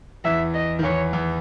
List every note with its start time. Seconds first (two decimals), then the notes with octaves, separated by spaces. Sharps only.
0.24 E2 E3 E5
0.54 D#5
0.79 D#3
0.83 E2 E3 C#5
1.13 E2 E3